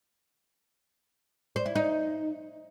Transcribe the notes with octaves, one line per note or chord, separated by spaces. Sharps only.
C5
E4
D#4